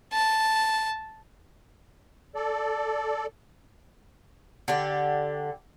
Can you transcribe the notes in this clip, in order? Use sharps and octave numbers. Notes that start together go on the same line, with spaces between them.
A5
A4 D5
D3 G4